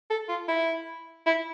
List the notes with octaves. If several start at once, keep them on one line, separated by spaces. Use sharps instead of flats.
A4
F4
E4
E4